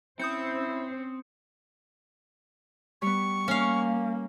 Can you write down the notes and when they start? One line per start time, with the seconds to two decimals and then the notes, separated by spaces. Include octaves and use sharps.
0.20 C4 C#4 E4 C5 D#6 G6 C#7
3.02 G3 B3 C#6
3.48 A#3 C#4 F5